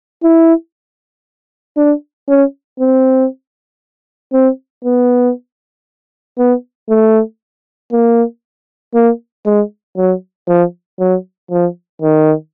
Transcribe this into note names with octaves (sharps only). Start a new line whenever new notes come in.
E4
D4
C#4
C4
C4
B3
B3
A3
A#3
A#3
G#3
F#3
F3
F#3
F3
D#3